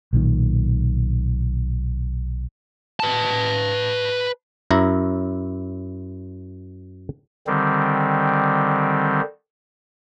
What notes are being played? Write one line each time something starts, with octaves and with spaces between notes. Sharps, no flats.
B1 A#2 D#3
B4 A5
F#2 E4 A#5
D3 D#3 G3 C4